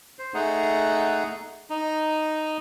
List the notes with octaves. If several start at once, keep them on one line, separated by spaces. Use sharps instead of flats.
C5
A3 D#4 G#4 F#5
D#4